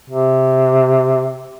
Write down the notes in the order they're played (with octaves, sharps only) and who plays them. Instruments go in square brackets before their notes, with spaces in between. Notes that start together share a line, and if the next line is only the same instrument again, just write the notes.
[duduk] C3